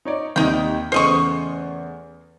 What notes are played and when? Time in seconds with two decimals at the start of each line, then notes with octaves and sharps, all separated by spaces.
0.05 D#4 C#5 D5
0.36 D#2 C3 D#3 D#4 G5
0.92 E2 C#3 A3 C5 D#5 C#6